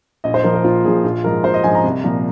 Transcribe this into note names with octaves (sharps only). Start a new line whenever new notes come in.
A#1 D#5
C5
A#2 F3 A#4
A#4
A#1 F4
A#2 F3 G#4
A#1 F4
G#2 F3 A#4
A#1 C5
D#5
G#2 F3 G#5
A#5
C2
A#2 F3